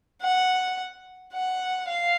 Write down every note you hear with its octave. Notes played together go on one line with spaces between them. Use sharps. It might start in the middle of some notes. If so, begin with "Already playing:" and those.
F#5
F#5
F5